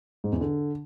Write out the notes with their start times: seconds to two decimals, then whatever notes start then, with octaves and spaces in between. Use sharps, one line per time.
0.24 G#2
0.32 E2
0.41 D3